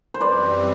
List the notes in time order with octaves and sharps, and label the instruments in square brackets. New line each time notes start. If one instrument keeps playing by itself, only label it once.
[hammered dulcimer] C5
[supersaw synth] F#2 E3 G3 C4 [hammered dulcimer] B4 D5